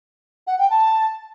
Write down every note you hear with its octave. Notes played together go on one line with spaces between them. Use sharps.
F#5
G5
A5